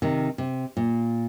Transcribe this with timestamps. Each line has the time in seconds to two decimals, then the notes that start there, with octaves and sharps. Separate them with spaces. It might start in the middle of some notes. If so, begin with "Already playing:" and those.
0.02 C3 D#3
0.38 C3
0.77 A#2